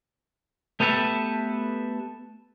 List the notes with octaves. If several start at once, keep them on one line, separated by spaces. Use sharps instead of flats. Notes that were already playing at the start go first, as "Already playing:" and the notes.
A3 B3 G4 A4 B4 E5